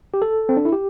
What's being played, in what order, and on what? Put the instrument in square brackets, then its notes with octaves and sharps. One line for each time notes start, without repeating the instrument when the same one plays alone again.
[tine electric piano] G4
A4
C4
D4
E4
G4